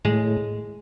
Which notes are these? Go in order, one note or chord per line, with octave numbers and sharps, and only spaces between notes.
A2 G#3